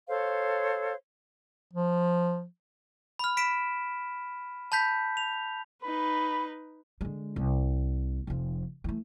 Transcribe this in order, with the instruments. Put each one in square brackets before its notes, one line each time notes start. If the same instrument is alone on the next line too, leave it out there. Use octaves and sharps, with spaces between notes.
[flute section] A4 C5 C#5 F5
[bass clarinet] F3
[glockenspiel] B5 F6
B5 B6 D7 E7
A5 B5 G6 B6
F7
[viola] D#4 B4 [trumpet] B5
[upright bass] D3 G#3
C2
F1 F3
E3 A3